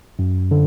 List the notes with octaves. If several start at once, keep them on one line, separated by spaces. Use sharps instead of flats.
F#2
D3